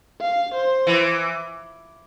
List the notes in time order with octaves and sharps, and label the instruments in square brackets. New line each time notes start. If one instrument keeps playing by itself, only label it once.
[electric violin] F5
C5
[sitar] E3